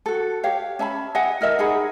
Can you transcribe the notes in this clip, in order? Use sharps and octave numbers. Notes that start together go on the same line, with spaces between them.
F#4 A4
G4 C#5 F5
C#4 E5 A5 B5
D#5 E5 F#5 G#5
E4 A#4 D#5 E5
D#4 G#4 F#5 B5